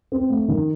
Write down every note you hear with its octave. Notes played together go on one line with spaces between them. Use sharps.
C4
A3
D#3